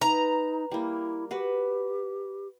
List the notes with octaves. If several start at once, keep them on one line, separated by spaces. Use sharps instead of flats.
D#4 B4 A#5
G3 A#3 E4
F#4 G4 B4